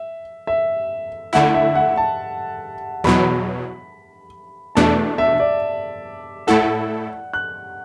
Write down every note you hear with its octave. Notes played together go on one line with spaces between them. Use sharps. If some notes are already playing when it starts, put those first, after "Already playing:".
Already playing: E5
E5
D3 A3 E4 F#5
E5
F#5
A5
E2 B2 F#3 B5
E2 B2 A3 D4 A5
E5
D5
A2 A3 E4 A4 F#5
F#6